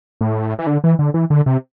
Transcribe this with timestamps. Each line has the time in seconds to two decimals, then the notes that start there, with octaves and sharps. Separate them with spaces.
0.21 A2
0.59 E3
0.67 D3
0.84 E3
0.99 D3
1.14 E3
1.30 D3
1.46 C3